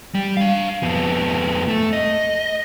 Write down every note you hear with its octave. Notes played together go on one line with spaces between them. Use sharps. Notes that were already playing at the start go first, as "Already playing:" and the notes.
G3
D4 F5
F2 B3
A3
D#5